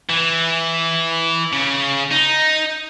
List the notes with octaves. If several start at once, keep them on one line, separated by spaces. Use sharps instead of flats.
E3
C#3
D#4